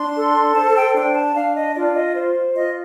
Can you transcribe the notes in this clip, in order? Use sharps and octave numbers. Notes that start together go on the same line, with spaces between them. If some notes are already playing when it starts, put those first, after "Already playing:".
Already playing: D4 C6
A4
C5 A5
G5
D4 G5
A5
D4 F5
D#5
F4 D5
D#5
C5
F4 D#5